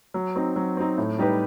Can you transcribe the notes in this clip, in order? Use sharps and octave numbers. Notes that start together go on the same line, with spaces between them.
F#3
C4 D#4
F#3
C4 D#4
A2
G3 D#4 G4 B4